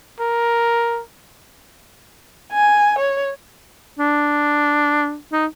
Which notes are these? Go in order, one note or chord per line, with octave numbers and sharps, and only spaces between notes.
A#4
G#5
C#5
D4
D#4